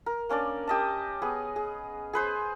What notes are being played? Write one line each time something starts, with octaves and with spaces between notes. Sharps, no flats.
A#4
A#3 C#4 D4 D5
G4 D#5 A5
B3 G#4
G#4
G#4 B4 C5